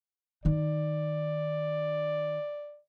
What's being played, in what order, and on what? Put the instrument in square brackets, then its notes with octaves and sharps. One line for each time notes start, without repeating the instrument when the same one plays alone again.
[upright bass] D#3 D#4 [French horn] D5